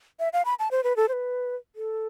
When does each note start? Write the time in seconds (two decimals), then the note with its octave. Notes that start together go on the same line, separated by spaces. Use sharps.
0.20 E5
0.33 F5
0.45 B5
0.59 A5
0.71 C5
0.84 B4
0.96 A4
1.08 C5
1.13 B4
1.76 A4